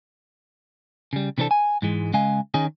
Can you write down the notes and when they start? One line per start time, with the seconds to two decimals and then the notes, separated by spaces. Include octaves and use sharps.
1.13 C#3 G3
1.38 C3 E3 C4 D4 A4
1.51 G#5
1.82 G#2 E3 G#3
2.13 C#3 G#3 D#5 F5 G#5
2.54 D#3 C#4 D#4 G#4